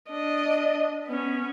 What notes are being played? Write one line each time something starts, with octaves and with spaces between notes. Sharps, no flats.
D4 D#5
B3 C#4